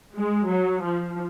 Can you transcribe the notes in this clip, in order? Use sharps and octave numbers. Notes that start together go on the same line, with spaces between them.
G#3
F#3
F3